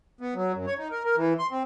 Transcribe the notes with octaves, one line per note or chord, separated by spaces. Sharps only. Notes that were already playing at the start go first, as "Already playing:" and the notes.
B3
F#3
F#2
C#5
D#4
A#4
A#4
E3
C6
C4